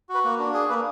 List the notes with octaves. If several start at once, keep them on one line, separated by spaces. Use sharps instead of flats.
F#4
B4
A#3
D4
G#4
A#3 B4